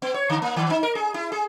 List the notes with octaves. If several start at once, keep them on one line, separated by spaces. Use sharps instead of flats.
B3
C#5
D3
A#3
D#3
D#4
A#4
G#4
E4
G#4